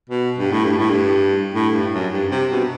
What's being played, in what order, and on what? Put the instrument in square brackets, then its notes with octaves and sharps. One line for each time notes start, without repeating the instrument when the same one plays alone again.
[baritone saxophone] B2
G2
A2
G2
A2
G2
A2
G2
F#2
G2
C3
B2